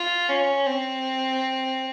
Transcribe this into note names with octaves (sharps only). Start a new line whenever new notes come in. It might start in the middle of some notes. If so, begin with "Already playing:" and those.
Already playing: F4
C#4
C4